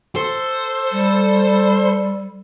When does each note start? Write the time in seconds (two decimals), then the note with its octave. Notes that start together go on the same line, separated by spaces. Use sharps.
0.16 A4 C5
0.92 G3